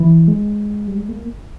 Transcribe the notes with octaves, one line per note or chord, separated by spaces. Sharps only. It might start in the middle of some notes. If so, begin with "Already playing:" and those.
Already playing: E3
G#3
G3
G#3
A#3